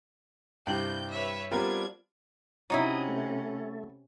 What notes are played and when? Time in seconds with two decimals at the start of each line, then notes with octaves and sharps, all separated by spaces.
0.67 C2 G2 C3 G5 G6 F#7
1.11 B4 C#5 E5
1.51 G3 B3 C4 D4 F4 G4 A#4 G#6
2.70 C3 F#3 C#4 D#4 E4 D#6
3.08 A3